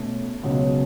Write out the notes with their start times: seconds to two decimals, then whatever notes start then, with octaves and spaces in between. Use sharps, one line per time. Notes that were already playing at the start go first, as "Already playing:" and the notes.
Already playing: B2 A3 C#4
0.43 C#2 B2 F#3 C#4